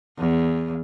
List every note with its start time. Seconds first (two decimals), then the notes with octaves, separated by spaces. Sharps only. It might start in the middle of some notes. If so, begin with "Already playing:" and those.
0.19 E2